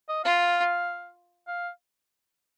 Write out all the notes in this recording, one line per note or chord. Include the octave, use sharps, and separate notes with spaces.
D#5
F4 F5
F5